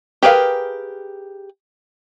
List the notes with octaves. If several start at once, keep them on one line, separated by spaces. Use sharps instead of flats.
G4 G#4 A#4 B4 F5